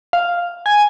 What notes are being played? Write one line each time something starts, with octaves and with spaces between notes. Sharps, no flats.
F5
G#5